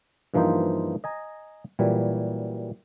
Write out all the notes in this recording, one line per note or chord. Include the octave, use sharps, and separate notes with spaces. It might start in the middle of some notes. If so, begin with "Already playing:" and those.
G2 E3 F3 A#3 D#4 C5
D#5 G#5 A#5
A#2 E3 F#3 G3